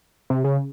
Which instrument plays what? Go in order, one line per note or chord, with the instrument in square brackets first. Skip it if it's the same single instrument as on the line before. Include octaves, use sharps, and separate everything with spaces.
[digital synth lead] C3
C#3